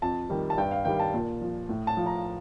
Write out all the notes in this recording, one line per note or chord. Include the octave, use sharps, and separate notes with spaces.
F2 A5
D#3 G3
A5
G2 G5
F5
D#3 G3 G5
A5
A#2
F3
A2
A5
F3
A#5